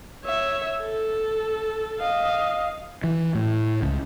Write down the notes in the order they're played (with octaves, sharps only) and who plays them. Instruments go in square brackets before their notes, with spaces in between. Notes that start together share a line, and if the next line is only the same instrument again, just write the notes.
[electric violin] C#5 E5
A4
D#5 F5
[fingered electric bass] E3
A2
C#2